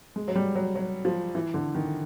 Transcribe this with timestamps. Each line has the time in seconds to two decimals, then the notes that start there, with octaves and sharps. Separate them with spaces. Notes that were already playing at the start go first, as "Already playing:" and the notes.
0.16 G#3
0.28 F#3
0.36 G3
0.55 F#3
0.75 F#3
1.05 F3
1.35 E3
1.54 D3
1.75 D#3